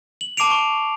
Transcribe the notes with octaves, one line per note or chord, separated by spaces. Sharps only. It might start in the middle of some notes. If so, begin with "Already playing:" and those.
F#7
A5 D6 C7 D7 F7
C#6 D7